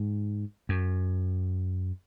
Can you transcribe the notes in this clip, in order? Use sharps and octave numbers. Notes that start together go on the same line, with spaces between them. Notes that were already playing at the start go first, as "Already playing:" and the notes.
Already playing: G#2
F#2